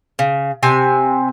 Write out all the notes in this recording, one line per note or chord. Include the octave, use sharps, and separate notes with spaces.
C#3
C3 C4 G#5